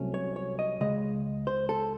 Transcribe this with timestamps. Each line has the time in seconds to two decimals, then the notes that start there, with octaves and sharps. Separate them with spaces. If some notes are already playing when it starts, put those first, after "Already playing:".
Already playing: C2 C3 F#3 A3 C#4
0.14 C#5
0.36 C#5
0.59 D#5
0.81 C#2 C#3 G#3 D#5
1.47 C5
1.69 A4